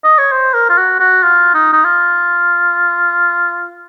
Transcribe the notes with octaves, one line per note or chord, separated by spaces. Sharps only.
D#5
C#5
C5
A#4
F4
F#4
F#4
F4
D#4
D#4
F4